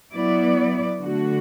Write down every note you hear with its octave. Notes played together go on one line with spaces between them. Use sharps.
F#3 B3 E4 D5
D3 A3 F#4